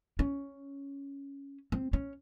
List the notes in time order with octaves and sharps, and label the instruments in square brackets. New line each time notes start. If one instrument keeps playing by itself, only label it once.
[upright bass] C#4
C4
C#4